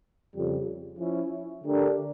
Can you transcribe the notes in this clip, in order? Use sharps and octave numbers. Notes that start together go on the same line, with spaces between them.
F2 C#3 G3
F3 C#4 E4
D3 A3 D4 G4 A#4